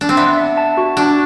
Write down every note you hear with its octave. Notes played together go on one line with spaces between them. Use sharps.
D4
C4
B3 E5
E5
A5
F#4
D4 F#4